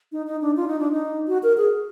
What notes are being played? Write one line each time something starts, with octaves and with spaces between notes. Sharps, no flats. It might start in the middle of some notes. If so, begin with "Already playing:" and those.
D#4
D#4
D4
F4
D#4
D4
D#4
F#4
A#4
G#4